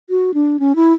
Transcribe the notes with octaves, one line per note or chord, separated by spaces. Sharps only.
F#4
D4
C#4
E4